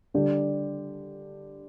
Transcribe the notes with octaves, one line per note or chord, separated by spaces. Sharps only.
D3 G3 D4 G4 D5